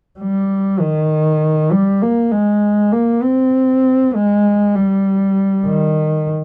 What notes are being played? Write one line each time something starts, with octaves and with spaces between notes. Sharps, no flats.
G3
D#3
G3
A#3
G#3
A#3
C4
G#3
G3
D#3